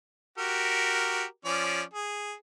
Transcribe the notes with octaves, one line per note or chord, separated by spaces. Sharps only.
F#4 G4 A#4
F3 C#4 D5
G#4